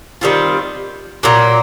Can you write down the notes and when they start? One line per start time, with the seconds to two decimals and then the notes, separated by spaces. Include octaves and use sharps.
0.21 D#3 G3 C4 F4
1.23 A#2 F#3 A#3